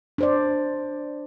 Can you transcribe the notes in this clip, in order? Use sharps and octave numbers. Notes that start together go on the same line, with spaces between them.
D4 C5 D5